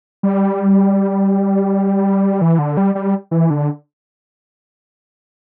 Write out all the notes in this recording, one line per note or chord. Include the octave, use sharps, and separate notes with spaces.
G3
E3
D3
G3
G3
E3
D3